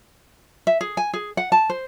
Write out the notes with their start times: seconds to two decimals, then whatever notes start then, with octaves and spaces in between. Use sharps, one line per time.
0.67 E5
0.81 G#4
0.97 G#5
1.14 G#4
1.37 F#5
1.52 A5
1.70 C5